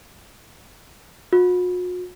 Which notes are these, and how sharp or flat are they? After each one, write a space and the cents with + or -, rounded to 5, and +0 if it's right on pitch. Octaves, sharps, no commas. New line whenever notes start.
F#4 -45